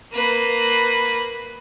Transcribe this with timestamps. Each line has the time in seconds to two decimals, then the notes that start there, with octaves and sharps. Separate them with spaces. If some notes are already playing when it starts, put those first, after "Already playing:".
0.13 A#3 B4